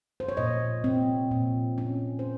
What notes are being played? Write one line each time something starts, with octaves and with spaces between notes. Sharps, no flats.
C5
C#5
A#2 D#5
C4
A#2
C#4
C5